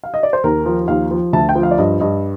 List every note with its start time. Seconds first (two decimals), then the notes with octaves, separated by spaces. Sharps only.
0.03 F5
0.14 D#5
0.23 D5
0.33 C5
0.44 D#2 A#4
0.66 F3
0.88 D#2 F5
1.11 F3
1.33 D2 A5
1.49 G5
1.55 F3
1.63 F5
1.71 D5
1.78 G2 D#5
2.00 G2 D#5